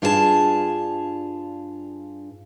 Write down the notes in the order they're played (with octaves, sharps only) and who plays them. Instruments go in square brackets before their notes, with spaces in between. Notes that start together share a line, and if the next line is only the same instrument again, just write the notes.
[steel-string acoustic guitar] G2 D4 F4 G#4 A4 A5